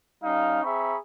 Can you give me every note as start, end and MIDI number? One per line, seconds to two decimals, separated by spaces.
0.23 0.59 55
0.23 0.59 61
0.23 0.59 63
0.23 0.59 77
0.64 0.97 60
0.64 0.97 68
0.64 0.97 76
0.64 0.97 82
0.64 0.97 83
0.64 0.97 85